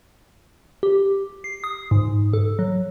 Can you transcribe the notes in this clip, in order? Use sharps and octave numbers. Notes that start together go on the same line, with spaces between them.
G4
C7
D#6
G#2
A4
F#3